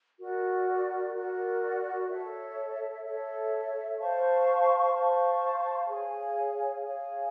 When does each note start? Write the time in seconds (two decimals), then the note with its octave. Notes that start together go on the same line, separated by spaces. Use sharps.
0.19 F#4 A#4 D5
1.14 F#4 A#4 D5
2.09 A4 C#5 E5
3.03 A4 C#5 E5
3.99 C5 F5 A5 C#6
4.93 C5 F5 A5 C#6
5.87 G#4 C#5 F5 G#5
6.83 G#4 C#5 F5 G#5